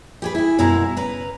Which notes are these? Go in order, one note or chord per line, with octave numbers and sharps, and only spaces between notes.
G4 G#4 B4
E4 G#4
F#2 B2 G#3 E4 A#5
C#3 B4 A#5